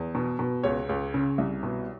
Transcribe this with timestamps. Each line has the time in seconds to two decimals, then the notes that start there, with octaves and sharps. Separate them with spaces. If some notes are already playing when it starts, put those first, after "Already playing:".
Already playing: E2
0.15 B2
0.39 B2
0.64 C#2 C#5
0.89 C#2
1.14 C#3
1.38 C2
1.63 B2